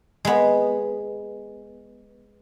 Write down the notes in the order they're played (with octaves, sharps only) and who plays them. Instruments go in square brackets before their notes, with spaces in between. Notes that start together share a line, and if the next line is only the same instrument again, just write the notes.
[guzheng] G#3 B3